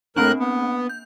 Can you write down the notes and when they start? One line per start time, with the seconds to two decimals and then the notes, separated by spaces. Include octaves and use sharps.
0.16 A2 A#3 C4 D4 A#4 F#6
0.40 B3
0.89 G6